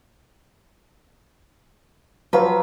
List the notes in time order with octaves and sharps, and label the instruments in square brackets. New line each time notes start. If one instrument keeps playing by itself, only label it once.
[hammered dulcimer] F3 F#3 F5 [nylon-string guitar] B4